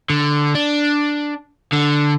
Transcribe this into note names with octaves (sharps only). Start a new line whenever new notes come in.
D3
D4
D3